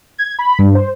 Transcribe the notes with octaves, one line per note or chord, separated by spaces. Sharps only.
G#6
B5
G2
C5